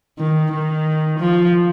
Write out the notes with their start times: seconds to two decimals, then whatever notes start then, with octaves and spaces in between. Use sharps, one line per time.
0.18 D#3
0.52 D#3
1.19 F3